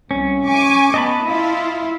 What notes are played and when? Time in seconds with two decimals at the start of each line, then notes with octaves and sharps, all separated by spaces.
0.11 C2 C#4
0.47 G#5 C#6 D6
0.94 B3 D#5 A5 B5
1.25 E4 F4